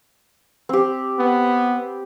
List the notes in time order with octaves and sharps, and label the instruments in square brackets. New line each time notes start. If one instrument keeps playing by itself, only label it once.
[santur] C4 G4
[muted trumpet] B3